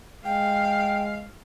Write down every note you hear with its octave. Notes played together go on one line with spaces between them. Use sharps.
G#3 F5 G5